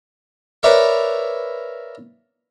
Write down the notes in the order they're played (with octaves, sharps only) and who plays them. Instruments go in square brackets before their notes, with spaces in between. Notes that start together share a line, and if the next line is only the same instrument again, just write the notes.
[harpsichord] A#4 B4 C#5 D5 E5 F5